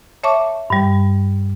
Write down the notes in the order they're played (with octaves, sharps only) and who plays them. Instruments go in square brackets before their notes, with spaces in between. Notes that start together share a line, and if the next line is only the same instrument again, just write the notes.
[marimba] C#5 E5 A5 C#6 D6
G2 G3